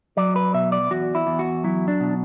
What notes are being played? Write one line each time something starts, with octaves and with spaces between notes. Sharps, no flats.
F#3 D5
B4
B2 E5
D5
E2 F#4
E4
E2
F#4
F#3 E4
D4
B2